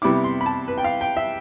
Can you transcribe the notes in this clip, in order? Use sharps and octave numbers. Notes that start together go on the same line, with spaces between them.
C3 G3 B3 E4 D6
C6
B5
A5
B4
G5
F5
G5
E5